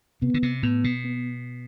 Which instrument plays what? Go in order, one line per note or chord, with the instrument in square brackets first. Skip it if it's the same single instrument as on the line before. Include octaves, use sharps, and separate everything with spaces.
[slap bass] C3 [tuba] B3
[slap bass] D3
C3
[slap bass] A2 [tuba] B3
[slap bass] B2
[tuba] B3